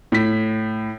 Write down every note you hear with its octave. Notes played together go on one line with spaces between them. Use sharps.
A2 B6